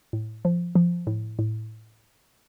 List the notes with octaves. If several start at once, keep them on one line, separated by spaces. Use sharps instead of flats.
A2
F3
F3
A2
A2